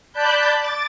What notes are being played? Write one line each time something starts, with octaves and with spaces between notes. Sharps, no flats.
D5 A5 B5 F#6 G6
D6 A6